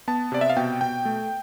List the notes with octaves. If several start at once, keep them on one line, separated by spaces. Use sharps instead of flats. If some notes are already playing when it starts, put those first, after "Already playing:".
B3 A5
C3 D5
E5
F5
B2 G5
B2 G5
A3